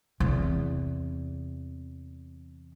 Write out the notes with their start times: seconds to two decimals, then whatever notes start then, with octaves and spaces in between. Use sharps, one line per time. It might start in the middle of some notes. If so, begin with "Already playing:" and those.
0.20 E2 C3